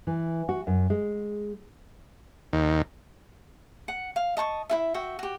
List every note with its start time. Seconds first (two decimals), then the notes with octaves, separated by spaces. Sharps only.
0.07 E3
0.49 F#4
0.67 F#2
0.90 G#3
2.53 D#2
3.88 F#5
4.16 F5
4.37 D#5 A5 C6 C#6
4.69 E4 F#4 E5
4.94 F#4 E5 G5
5.19 F#4 G4